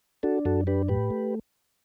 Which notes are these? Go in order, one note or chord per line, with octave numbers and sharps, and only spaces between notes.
D4 F#4 A4
F#2 F#4 A4
D4 G4 B4
A2 G4 B4
A3